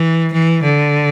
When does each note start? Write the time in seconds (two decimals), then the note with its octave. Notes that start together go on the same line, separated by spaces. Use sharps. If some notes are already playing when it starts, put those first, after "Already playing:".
Already playing: E3
0.33 E3
0.63 D3